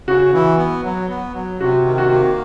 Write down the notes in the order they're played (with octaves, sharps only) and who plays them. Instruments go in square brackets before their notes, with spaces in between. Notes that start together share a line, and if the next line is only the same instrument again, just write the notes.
[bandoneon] C#3 [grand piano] F#4
[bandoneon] E3
B3
F#3
B3
F#3
[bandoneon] C3 [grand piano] F#4
[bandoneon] D#3
[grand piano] F#4
[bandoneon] A#3